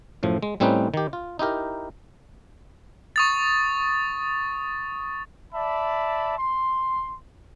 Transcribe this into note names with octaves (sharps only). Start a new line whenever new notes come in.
F#2 A2 F3
G#3
A2 G3 C4 C#4 D#4 B4
D#3 G4
F4
D#4 E4 G4 A#4
C#6 D#6 A6
D5 E5 A5 B5
C6